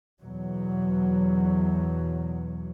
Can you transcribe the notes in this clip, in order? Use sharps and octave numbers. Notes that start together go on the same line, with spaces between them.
E2 B2 F#3